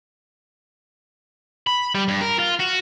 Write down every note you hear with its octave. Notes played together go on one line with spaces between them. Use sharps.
B5
G3
G2
A#4
F4
F#4